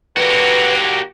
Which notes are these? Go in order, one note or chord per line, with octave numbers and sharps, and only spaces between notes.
D3 F#3 A#3 F#4 G4 B4